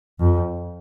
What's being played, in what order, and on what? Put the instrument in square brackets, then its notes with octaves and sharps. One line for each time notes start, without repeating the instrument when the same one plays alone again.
[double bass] F2